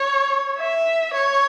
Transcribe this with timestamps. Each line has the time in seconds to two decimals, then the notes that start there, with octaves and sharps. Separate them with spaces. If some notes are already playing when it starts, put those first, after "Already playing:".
Already playing: C#5
0.58 E5
1.13 C#5